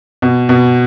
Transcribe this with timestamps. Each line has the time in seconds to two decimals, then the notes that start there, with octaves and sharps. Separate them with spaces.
0.22 B2
0.49 B2